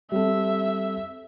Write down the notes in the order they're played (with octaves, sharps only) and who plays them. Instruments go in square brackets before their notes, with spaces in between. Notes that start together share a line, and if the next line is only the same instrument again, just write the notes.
[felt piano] G3 C4 A4 [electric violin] E5